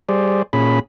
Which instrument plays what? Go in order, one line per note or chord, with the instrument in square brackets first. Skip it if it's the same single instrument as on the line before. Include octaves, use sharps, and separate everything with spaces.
[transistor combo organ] G3 G#4 C5 D5
A#2 C#4 G#4 B5